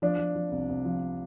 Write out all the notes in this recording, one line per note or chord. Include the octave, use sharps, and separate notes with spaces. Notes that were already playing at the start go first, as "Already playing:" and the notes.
F3 D4
F3
F3
C2
C2
F3